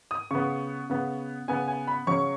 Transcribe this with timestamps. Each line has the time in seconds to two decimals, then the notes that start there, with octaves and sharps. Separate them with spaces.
0.11 D#6
0.31 C#3 B3 C#6
0.90 C#3 B3
1.48 C#3 B3 G#5
1.68 G#5
1.87 B5
2.07 C#3 F#3 C#4 C#6